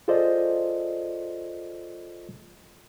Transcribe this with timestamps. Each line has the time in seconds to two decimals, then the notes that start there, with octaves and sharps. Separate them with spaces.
0.08 F4 G#4 A4 C5 D5 D#5